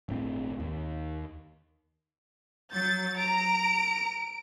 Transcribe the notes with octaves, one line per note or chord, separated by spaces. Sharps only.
D1 G1 A2 C4
D#2
F#3 G6 A6
A#5 D7